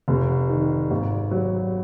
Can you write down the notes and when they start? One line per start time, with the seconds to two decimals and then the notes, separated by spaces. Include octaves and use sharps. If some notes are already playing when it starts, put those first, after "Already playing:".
0.08 F1
0.50 D#3
0.90 G#1
1.31 F#3